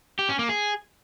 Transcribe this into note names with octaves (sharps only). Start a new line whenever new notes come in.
G4
C#4
A#3
G#4